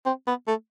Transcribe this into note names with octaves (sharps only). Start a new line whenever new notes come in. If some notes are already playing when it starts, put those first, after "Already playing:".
C4
B3
A3